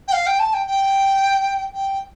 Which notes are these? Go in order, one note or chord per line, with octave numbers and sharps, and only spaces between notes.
G5
F5
G5
A5
G5
G5
G5